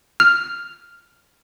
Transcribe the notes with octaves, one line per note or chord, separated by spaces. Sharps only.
F6